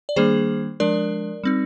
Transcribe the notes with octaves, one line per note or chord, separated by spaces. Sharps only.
D5
D#3 G3 A#3 D4 G#4 C5
F3 G#3 D4 A#4 D5
G3 C4 D#4